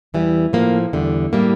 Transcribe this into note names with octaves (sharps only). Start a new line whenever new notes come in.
E2 E3 G3
A2 F3 A#3
E2 D3 G3
A2 G3 A#3